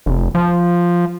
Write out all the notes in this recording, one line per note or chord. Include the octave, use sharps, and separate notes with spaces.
F1
F3